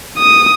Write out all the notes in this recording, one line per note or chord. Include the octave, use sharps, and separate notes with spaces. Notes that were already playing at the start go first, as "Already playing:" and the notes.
D#6